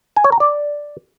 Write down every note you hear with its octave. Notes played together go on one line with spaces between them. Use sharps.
G#5
C#5
A#5
D5